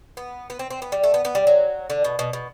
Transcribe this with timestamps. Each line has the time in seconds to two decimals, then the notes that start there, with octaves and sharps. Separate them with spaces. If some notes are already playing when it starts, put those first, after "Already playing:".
0.17 B3
0.50 B3
0.59 C4
0.70 C4
0.82 B3
0.92 G3
1.04 A3
1.14 B3
1.25 B3
1.35 G3
1.47 F#3
1.90 D3
2.04 B2
2.19 B2
2.33 B2